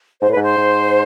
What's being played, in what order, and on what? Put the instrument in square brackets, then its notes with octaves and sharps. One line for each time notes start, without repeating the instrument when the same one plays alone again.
[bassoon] G#2 [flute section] C5
[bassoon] A2
[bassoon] G#2 [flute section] B4
[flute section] C5
[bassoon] G#2